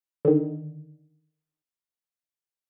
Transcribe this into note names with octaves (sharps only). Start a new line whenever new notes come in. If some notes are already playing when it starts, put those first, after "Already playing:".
D3 D#3